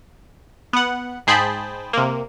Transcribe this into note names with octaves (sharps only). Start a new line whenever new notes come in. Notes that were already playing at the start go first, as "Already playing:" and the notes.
B3 F#5
G#2 G#4 C5 G5 A5 B5
C3 A#3